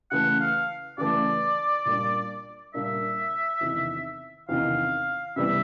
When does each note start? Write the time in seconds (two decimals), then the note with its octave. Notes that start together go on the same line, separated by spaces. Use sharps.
0.11 C#3 E3 A3 F#5
0.40 F5
0.98 C#3 E3 A3 D5
1.85 A#2 G3 A#3 D4 F4
2.74 A#2 G3 A#3 D4 F4 E5
3.61 E2 C3 D#3
4.49 E2 C3 D#3 F5
5.36 C3 E3 G3 B3 E4 E5